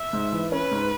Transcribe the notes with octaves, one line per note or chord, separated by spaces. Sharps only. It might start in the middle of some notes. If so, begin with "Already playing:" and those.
Already playing: E5
G#2
E3
C#4 B4
G#2